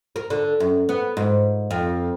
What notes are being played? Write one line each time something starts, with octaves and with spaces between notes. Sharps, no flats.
A#4
D3
F#2
B3
G#2
F2